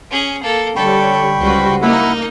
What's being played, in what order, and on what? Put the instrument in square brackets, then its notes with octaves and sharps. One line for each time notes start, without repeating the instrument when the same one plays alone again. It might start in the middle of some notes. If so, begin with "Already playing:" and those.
[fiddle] C#4 G#4
A#3 A4
[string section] D3 G3 C#5 [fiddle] A4 [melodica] G5 B5 C#6
[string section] C#2 G3 F#4 [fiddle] B4 C5
[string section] A#3 [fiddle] D#4 [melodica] E4 F#5 B5